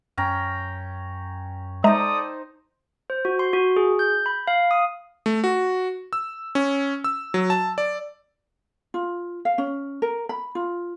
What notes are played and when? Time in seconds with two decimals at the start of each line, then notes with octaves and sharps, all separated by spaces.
0.17 F#2 C#4 G5 A#5
1.84 G#3 D#4 A4 C5 D5 E5 A#5 D#6
3.10 C5
3.25 F#4
3.39 C6
3.53 F#4
3.76 G#4
3.99 G6
4.26 B5
4.47 F5
4.71 D#6
5.26 A3
5.44 F#4
6.13 E6
6.55 C#4
7.04 E6
7.34 F#3
7.50 A5
7.78 D5
8.94 F4
9.45 F5
9.58 C#4
10.02 A#4
10.29 B5
10.55 F4